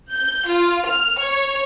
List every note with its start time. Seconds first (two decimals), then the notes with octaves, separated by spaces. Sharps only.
0.11 G6
0.47 F4
0.86 F6
1.18 C#5